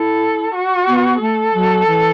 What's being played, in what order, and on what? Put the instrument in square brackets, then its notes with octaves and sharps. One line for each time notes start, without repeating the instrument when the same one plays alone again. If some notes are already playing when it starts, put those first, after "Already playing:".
Already playing: [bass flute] E4 [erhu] A4
[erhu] F#4
[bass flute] B3
[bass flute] A3 [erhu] A4
[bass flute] F#3
E3